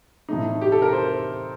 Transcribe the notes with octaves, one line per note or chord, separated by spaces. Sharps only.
A2 A3 D#4
G4
A4
A#4
C5